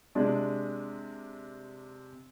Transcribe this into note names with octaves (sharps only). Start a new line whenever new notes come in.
C3 G#3 D4